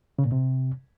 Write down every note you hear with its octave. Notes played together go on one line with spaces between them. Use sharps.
C#3
A#2
C3